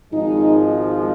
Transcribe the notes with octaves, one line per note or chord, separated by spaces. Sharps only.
G#1 G#2 F3 G#3 D#4